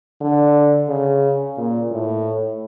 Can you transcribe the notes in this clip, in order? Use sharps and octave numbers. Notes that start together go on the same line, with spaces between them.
D3
C#3
A#2
A2